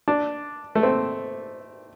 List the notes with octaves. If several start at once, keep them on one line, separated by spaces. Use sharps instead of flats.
D4
A3
C4